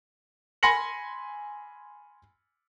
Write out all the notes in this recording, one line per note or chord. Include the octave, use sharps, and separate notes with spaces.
G#5 B5 C6 A#6 C#7 F#7